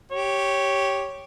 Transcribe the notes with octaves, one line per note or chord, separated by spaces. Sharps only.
G4 C#5